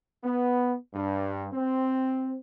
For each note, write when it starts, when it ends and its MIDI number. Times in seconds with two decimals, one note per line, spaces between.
0.24 0.75 59
0.94 1.49 43
1.53 2.37 60